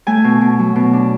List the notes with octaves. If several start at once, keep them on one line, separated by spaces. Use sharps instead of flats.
A3 G#5
B2
B2
F#3
B2
D4